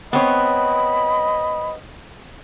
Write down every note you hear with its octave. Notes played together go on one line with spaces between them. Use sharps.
B3 C4 C#5 D#5 B5